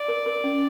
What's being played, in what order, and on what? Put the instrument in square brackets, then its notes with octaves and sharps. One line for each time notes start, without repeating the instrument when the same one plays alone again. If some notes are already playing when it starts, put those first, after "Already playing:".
Already playing: [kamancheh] D5
[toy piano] A#4
A#4
C#4